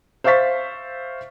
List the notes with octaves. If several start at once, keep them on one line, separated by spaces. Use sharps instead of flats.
C5 E5 F5 C#6 A6 B6